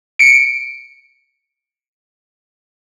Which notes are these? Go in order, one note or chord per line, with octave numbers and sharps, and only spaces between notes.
C#7 D7